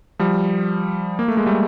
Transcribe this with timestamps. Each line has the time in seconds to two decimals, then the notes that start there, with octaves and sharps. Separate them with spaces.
0.19 F3 G3
1.19 A#3
1.28 A3
1.37 G#3
1.46 G3 A3